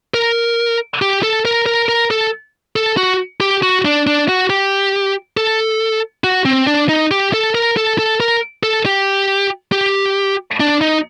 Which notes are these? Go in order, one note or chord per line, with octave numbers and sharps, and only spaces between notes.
A#4
G4
A4
A#4
A#4
A#4
A4
A4
F#4
G4
F#4
D4
D4
F#4
G4
A4
F#4
C4
D4
D#4
G4
A4
A#4
A4
A4
A#4
A4
G4
G4
D4
D#4